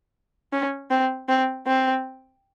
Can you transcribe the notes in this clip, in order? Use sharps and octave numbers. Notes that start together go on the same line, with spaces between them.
C#4
C4
C4
C4